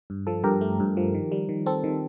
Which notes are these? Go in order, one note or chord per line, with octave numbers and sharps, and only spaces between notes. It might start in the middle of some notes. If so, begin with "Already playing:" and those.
G2
F3 A4
G2 G4 A#4
A3
G2
F3
D#3
G3
D#3
C4 A4
D#3